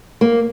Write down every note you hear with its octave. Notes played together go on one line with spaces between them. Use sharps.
A#3